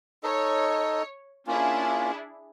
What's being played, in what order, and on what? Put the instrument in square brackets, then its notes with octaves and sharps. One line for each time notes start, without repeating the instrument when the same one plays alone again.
[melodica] D#4 A4 D#5 [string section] C#5
[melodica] A#3 C#4 F4 [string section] D4 E4 G#4